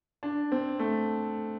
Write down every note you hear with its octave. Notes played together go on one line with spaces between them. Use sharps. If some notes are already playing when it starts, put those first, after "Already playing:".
D4
C4
A3